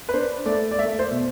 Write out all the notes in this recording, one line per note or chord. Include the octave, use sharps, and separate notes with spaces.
B4
D4 C5
A3 D5
D5
A3 E5
C5
B2